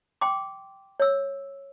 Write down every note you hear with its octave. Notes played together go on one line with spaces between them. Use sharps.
G5 C6 D6
C#5 E6